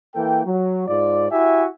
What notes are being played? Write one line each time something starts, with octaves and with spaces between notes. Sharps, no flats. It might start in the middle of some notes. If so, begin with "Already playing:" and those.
E3 A#3 A4 G5
F#3
G#2 F4 D5
E4 F#4 G4 E5 G#5